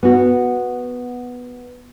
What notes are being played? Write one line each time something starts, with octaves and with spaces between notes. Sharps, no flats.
B3 F#4